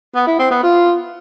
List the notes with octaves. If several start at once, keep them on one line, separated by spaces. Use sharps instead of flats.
B3
E4
C4
B3
F4